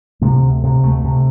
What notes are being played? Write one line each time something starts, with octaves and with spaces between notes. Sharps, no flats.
C3 A3
D2
C3
D2 A3
C3